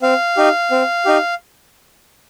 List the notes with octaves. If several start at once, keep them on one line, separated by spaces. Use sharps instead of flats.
C4 F5
D#4 G4
C4
D#4 G4